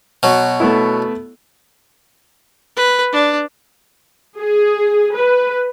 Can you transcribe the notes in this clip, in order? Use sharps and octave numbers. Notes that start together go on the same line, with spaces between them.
B2 F#3
A3 B3 E4
B4
D4
G#4
B4